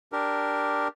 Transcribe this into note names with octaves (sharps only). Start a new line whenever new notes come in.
D4 G4 A#4